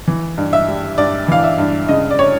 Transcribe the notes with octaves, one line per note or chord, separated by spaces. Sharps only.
E3
G2
E5
G3
G2 D5
E3 F5
E5
G2
C#3 D#5
D5
C#5